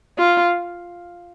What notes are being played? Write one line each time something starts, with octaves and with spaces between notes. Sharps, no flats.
F4